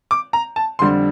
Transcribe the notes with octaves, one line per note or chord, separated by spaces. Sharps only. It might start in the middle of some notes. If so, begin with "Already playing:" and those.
D6
A#5
A5
F2 D3 G3 D4 C6